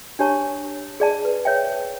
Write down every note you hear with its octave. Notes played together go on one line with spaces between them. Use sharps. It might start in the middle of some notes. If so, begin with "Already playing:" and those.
D4 G4 C#5 A5 C#6
G#4 D5 A5
B4
C#5 E5 G5